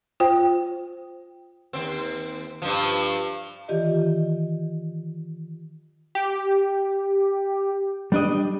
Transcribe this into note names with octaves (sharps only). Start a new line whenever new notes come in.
F4 C5 G5
D#2 C4
G2 F3
D#3 E3 F4 G4 D5 D#5
G4
G3 D4 D#5